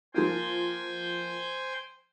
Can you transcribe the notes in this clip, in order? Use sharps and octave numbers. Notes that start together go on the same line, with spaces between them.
F3 A#3 F4 C5 G5 G#5